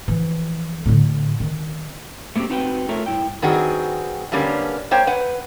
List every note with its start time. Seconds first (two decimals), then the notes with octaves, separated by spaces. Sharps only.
0.08 E3 F3
0.86 A2 D3
1.40 D#3
2.36 A3 A#3 C4 C#4 G4
2.50 C4 D#4 F#4 B4 F#5 G5
2.89 A3 F4 A4 A#4 C#5 E5
3.06 G2 E4 G5
3.42 G2 D#3 C4 F#4 G#4
4.32 G2 D3 G3 A#3 C#4
4.91 A#3 C5 C#5 G5
5.07 B4 F#5